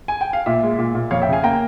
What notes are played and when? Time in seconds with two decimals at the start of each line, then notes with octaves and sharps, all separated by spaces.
0.08 G#5
0.21 G5
0.33 F5
0.46 A#2 E5
0.63 G#3
0.78 A#2
0.95 A#2
1.11 F2 C#5 F5
1.22 E5 G5
1.27 C#3
1.33 F5 G#5
1.43 A#3 G5 A#5